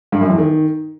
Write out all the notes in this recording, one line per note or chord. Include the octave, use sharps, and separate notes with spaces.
G2
F#2
E2
D#3